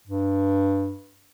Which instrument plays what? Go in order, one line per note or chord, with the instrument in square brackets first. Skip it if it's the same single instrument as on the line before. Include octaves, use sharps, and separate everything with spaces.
[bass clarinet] G2